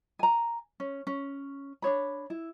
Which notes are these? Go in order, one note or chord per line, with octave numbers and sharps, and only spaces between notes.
G#5 A#5
C#4
C#4
D4 D#4 C#5 B5
E4